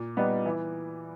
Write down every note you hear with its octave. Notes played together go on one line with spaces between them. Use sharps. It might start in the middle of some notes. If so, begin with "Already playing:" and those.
Already playing: A#2
G3 B3 D#4
E3